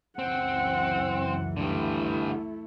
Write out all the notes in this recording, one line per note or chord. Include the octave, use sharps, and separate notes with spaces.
C#2 F#2 E3 C4 F#5
D3 G3 A3 E4